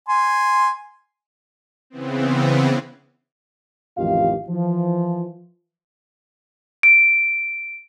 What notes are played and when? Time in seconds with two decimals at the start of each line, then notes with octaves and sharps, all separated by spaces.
0.09 G#5 C6
1.90 C#3 E3 B3 C4
3.97 A1 F2 D#3 F4 G4 F5
4.48 E3 F3
6.83 D7